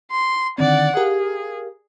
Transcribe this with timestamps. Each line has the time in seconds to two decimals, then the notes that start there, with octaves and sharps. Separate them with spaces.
0.12 C6
0.58 D3 D#3 C4 D5 F#5
0.97 G4 G#4 A#4 F5